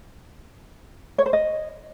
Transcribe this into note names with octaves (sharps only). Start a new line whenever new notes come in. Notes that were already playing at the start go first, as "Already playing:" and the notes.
C#5
C5
D#5